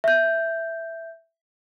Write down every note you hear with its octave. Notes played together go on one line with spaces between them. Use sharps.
E5 G6